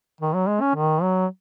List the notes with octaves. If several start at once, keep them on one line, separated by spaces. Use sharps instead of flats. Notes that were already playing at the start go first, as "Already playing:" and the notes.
D#3
F#3
G#3
C#4
D#3
F#3